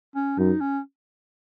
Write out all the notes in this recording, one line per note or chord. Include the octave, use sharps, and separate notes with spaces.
C#4
F#2 D#4
C#4